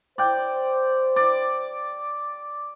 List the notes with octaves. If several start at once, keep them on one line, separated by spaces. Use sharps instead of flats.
C5 D5 G5
D5